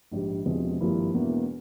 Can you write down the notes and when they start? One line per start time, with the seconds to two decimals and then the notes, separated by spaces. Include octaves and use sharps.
0.11 A#1 G#2 G3
0.45 E1 E2 C3 F3 G#3
0.80 G#1 G2 F3 A#3 E4
1.14 E1 E2 E3 A#3